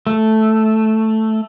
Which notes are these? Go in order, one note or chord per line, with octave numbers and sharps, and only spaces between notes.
A3